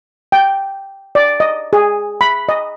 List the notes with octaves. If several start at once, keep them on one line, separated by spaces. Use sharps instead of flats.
G5
D5
D#5
G#4
B5
D#5